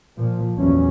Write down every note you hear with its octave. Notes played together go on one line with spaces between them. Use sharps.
A#2 F3
A#1 E2 F#3 C#4